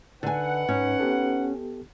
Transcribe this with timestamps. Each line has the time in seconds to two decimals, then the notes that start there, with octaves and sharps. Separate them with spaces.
0.23 D3 D#4 B4 F#5 G#5
0.69 G#2 C#4
1.00 B3 G4 A4